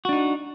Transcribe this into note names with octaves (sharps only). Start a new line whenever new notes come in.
D4 D#4 F#4